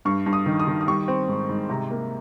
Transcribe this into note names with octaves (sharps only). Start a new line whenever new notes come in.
G2 C#6
G2
D#6
D#3
D#6
D#3
D#6
G3 C#6
C4
G#2
G#2
C3 A#5
A#3